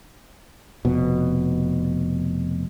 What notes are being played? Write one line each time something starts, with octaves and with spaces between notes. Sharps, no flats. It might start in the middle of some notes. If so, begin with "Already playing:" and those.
F1 B2